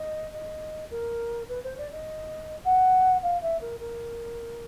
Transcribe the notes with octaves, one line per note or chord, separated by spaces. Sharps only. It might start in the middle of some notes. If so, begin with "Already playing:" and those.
Already playing: D#5
D#5
A#4
B4
C5
D5
D#5
F#5
F5
E5
A#4
A#4